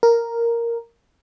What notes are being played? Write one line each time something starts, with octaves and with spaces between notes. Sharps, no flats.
A#4